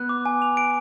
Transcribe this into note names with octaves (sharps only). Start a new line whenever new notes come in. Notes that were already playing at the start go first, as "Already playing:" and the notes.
Already playing: B3 F#6
D6
G#5
F7
D7